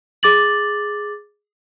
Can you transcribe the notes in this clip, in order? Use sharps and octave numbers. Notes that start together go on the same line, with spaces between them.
G#4 D6 A6 F#7